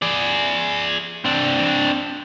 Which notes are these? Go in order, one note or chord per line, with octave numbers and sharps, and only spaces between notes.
G#4 D5
C4 D4